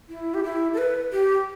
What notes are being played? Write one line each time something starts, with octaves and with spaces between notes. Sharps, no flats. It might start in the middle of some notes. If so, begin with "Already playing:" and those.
E4
G4
E4
A4
B4
G4